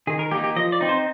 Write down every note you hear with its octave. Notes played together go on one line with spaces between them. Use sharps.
D#3 G#4
A#4
A#3 D#4 G4
G4
F3 D#5
D5
C4 D#4
C5